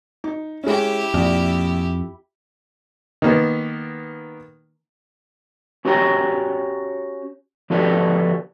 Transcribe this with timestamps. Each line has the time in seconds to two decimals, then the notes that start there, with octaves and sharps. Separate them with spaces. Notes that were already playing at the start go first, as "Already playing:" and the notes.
0.24 D#4
0.64 G#3 C#4 E4 G4
1.14 A#1 F2
3.22 D#3 A#3 B3
5.85 C#4 F#4 G4 C#5 G5 A#5
7.70 F3 F#4 G4 A4 B4 D5